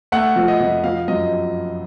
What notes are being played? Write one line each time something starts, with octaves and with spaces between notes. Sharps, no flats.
A3 F#5
F3
D#5
F2
F3 F5
F#2 D#5